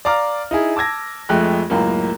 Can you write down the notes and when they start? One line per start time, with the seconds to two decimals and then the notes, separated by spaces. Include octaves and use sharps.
0.05 D5 F5 A#5 D6 F6
0.51 D#4 E4 G#4
0.76 A5 D6 E6 G#6 A#6
1.29 F2 G#3 A3 G5 F#6
1.70 C#2 F#2 A2 A#3